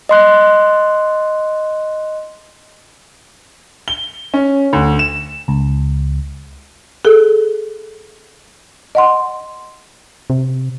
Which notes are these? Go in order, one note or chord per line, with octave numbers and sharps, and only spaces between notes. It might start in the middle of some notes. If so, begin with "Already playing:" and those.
D#5 C6 F#6
G7
C#4
D2
E7
C#2
G#4 A4
D#5 F#5 C6
C3